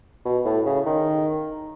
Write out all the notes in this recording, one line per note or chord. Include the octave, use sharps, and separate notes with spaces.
B2
A2
C#3
D#3